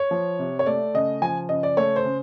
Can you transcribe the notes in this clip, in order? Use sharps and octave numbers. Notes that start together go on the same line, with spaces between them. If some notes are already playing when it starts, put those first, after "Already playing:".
Already playing: C#5
F3
C3
C#5
A3 D5
C#3 D#5
F3 G#5
C#3 D#5
D5
A3 C#5
C5
C#3